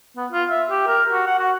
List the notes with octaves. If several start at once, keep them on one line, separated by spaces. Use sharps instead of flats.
B3
F4
E5
G4
A#4
F#4
F#5
F#4